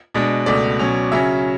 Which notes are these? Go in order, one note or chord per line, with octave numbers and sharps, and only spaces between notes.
B2 G#3 D4
C#2 B2 A3 D5
B2 F#3 C#4
C#3 F#3 C#4 E5